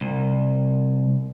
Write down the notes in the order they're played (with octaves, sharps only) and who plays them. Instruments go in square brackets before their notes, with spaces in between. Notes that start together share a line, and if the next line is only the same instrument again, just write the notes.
[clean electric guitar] C2